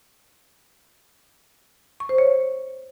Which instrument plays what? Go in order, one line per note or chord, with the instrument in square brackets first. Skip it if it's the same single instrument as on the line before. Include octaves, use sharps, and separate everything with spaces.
[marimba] C#6
C5
C#5